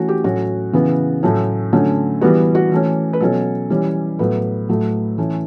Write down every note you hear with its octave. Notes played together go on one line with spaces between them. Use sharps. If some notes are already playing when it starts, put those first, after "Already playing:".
Already playing: E3 A3 C#4 F#4
G4
A2 F#3 C#4 F#4
C#3 E3 B3
A2 F#3 A3 C#4
D3 F#3 A3 C#4
E3 G3 B3 F#4
F#4
E3 A3 C#4
B4
B2 F#3 C#4 A4
E3 G3 C#4
A2 F#3 B3 B4
A2 F#3 A3
E3 A3 C#4